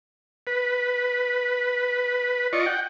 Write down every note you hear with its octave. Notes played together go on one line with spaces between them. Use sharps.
B4
F4 D5 D#5 C#6
F#5 G5